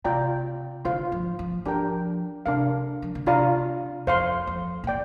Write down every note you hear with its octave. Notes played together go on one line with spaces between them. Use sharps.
C3 F4 D5 G5 A#5
D3 F4 C5 F5 C6
F3
F3
F3 D4 G4 A#4 G5 A#5
C3 D4 A#4 F5
F3
D3
C3 D4 F4 D5 F5 A#5
F2 C5 F5 C6
F2
A#2
D5 G5